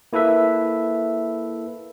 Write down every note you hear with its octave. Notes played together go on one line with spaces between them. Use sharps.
A#3 E4 A4 B4 E5